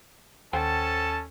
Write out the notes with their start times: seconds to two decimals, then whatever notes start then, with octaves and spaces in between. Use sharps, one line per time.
0.53 D#2 C#4 A4 C5 F#5 G5 A5